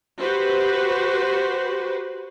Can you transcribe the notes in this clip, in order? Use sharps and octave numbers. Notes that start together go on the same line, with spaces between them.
F#4 G4 B4 C5